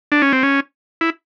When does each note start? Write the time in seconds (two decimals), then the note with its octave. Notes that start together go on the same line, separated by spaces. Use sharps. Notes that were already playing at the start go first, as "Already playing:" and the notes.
0.12 D4
0.22 C#4
0.33 C4
0.43 C#4
1.01 E4